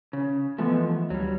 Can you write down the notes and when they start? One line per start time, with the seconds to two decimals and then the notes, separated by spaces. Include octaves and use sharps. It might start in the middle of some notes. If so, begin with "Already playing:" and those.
0.13 C#3
0.58 E3 F3 G#3 A3 B3
1.10 D2 F#3 G3